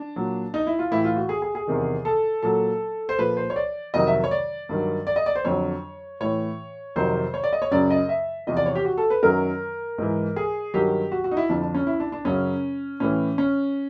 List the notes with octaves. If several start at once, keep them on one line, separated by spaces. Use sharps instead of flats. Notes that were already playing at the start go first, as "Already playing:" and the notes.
Already playing: D4
A#2 F#3
D#4
E4
F4
A2 E3 E4
F4
F#4
G#4
G#4
G#4
E2 C3 D#3
A4
A#2 F#3 A4
C5
A#2 F3 B4
C5
C#5
D5
F2 C3 D#3 F#3 D#5
E5
C#5
D5
G2 D#3 F#3
D5
D#5
D5
C5
F2 D3 F#3 C#5
A2 E3 C#5
F2 C3 D#3 F#3 C5
C#5
D5
D#5
C#5
F#2 C#3 F#3 D5
D#5
E5
E2 C3 F3 D#5
D5
C#5
G4
F#4
A4
B4
F#2 D#3 F#3 A#4
G#2 E3
G#4
G2 D#3 F#3 G4
F#4
F#4
D#4
E4
F2 D3 F3 D4
D4
C#4
E4
D4
D4
F#2 C#3 F#3 C#4
A2 E3 C#4
C#4